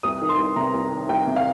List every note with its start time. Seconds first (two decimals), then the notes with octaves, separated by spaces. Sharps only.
0.03 C2 D#6
0.21 D#3
0.29 C6
0.38 C2
0.56 C3 A#5
0.74 C2
0.92 D#3
1.09 C2 G5
1.27 C3
1.36 F5